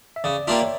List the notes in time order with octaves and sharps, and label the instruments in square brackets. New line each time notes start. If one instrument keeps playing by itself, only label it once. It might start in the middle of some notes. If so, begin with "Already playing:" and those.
[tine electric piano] E5
[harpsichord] C#3 [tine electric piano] D5
[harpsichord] G3 A#3 D4 F4 [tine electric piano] E5
[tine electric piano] C#5